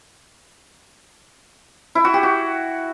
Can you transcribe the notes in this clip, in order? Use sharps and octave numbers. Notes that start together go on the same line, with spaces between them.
E4
F#4
G4
F#4